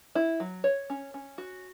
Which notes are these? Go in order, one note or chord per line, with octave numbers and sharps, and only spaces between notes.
E4
F#3
C#5
C#4
C#4
F#4